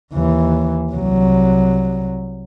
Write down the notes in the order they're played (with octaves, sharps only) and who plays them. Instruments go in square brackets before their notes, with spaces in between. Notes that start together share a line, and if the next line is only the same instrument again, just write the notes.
[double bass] D#2 E3
C2 F#3